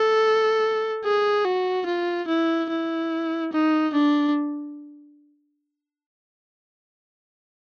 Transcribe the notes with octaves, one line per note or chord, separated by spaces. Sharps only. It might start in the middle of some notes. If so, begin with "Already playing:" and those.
Already playing: A4
G#4
F#4
F4
E4
E4
D#4
D4